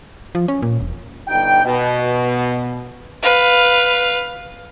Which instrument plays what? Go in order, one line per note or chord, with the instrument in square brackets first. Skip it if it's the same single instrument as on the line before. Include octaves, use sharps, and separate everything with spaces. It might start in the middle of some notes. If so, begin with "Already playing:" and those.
[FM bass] F3
C#4
A#2
E1
[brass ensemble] G1 G2 D#4 G5
B2
[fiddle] B4 F5